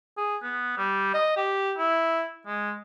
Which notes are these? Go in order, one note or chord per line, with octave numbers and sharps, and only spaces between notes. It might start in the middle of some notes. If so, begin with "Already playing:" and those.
G#4
B3
G3
D#5
G4
E4
G#3